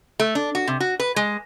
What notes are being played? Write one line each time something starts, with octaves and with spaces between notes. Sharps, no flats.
A3
D4
F#4
C3
F#4
B4
G#3